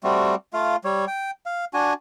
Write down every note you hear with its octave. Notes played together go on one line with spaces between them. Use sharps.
G3 A3 C4 F#4
A3 F4 F5
G3 C#5
G5
F5
D4 F#4 G#5